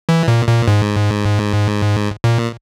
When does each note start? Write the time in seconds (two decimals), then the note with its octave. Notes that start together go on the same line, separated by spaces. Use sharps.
0.09 E3
0.28 A#2
0.48 A#2
0.68 G#2
2.24 A#2